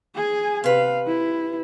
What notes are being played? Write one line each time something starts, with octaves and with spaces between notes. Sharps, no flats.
G#4 G#5
C3 B4 F5
E4